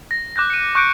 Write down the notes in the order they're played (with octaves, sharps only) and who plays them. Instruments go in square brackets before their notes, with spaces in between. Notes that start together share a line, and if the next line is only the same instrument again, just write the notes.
[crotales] A#6
D6 F#6 G6 A#6
C#7 D#7
C#6 D6 F#6 G6 C#7 D7